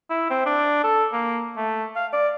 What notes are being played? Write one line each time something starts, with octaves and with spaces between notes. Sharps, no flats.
E4
C4
D4
A4
A#3
A3
F5
D5